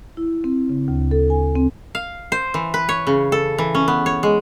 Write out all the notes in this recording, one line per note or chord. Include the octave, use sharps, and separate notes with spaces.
E4
C4
C#3
D2
A4
G#5
C4
F5
C5
E3
B4
C#5
C#3
A4
E3
C#4
B3
C#5
G#3